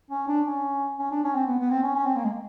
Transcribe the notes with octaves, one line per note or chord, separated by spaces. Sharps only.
C#4
D4
C#4
C#4
D4
C#4
C4
B3
B3
C4
C#4
C#4
C4
A#3
G#3